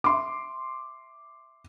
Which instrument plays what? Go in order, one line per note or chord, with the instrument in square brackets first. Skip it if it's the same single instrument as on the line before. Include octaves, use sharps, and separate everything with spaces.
[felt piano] E5 C6 D6